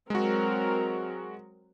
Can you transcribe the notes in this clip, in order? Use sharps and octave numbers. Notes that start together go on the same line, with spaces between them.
F#3 G#3 C4 F#4 A#4